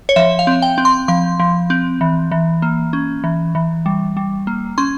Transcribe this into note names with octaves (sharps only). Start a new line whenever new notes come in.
C#5
F3 E5
F5
C4
G5
C4
C6
F3 C6
F3
C4
E3
E3
A#3
C#4
E3
E3
G3
G3
A#3
C#4 C6